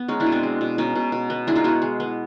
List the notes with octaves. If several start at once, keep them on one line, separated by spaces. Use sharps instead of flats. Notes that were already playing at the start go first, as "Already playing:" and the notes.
Already playing: B3
G#3 C#4 D#4
D4 E4
B2
C4 D4
G#3
B2
B2 C#4 D#4
B2
B2
B3
G#3 D4 E4
D#4 F4
B3 E4 F#4
G#3
B3